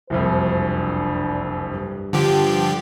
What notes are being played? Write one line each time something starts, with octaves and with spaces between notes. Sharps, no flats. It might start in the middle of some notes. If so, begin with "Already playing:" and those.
F#1 C2 F2 C5
D4
G2
D3 F3 G4